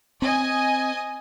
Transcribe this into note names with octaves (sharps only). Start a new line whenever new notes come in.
C4 D#5 G#5